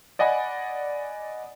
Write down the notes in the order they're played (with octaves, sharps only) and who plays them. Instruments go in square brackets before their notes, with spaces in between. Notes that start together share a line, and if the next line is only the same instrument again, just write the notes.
[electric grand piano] D5 D#5 F#5 G#5 B5